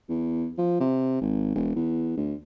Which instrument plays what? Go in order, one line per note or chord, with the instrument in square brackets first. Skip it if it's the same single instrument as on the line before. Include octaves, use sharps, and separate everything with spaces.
[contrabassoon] E2
F3
C3
G#1
E1
E2
D2